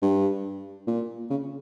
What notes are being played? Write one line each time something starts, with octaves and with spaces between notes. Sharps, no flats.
G2
A#2
C#3